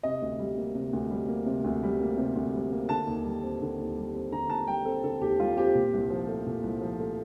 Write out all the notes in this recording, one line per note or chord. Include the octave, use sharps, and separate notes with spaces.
C3 D#5
D2
G3
A#3
C3
D2
G3
A#3
C3
D2
G3
A#3
C3
D2
G3
A#3
D3 A5
D#2
G3
C4
D3
D#2
G3
C4
D3 A#5
D#2 A5
G3 G5
C4 A4
D3 A4
D#2 G4
G3 F4
C4 G4
A#2
C2
F3
A3
A#2
C2
F3
A3